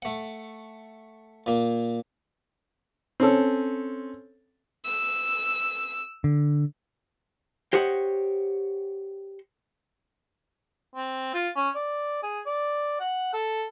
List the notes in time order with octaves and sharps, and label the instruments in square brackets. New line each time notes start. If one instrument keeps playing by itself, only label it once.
[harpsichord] A3 F#5
A#2 A#3
[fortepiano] C4 C#4 A4
[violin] E6
[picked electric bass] D3
[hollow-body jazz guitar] G4 C5 C#5 D#5 F#5
[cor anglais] C4
F4
C#4
D5
G#4
D5
F#5
A4